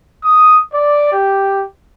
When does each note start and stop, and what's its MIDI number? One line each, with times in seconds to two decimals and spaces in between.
0.21 0.57 87
0.72 1.11 74
1.11 1.61 67